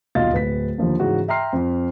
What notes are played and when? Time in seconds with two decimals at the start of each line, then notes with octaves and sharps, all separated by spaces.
0.15 D#1 B1 F4 D#5 F5 A6
0.32 D1 B4 B6
0.78 D#2 D3 F3 A#3
1.00 G#2 C#3 E3 F#4
1.28 E5 G5 A#5 C6 F6 C7
1.53 F2